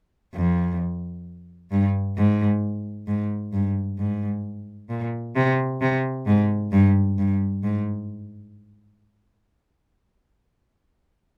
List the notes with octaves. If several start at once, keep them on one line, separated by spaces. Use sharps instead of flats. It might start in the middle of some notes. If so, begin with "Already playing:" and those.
F2
G2
G#2
G#2
G2
G#2
A#2
C3
C3
G#2
G2
G2
G#2